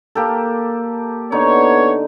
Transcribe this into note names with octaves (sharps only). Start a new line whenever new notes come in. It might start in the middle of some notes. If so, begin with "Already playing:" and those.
A#3 G4 A4
D3 B3 D#4 C#5